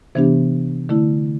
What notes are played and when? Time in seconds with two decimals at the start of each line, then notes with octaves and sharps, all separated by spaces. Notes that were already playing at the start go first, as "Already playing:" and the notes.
0.15 C3 E3 B3 D4 G4
0.89 D3 A3 E4